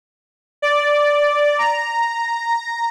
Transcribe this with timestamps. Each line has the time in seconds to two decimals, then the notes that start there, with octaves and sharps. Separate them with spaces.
0.62 D5
1.59 A#5